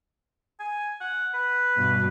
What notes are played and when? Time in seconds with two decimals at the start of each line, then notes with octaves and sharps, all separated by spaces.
0.60 G#5
1.01 F#5
1.34 B4
1.76 G2 B2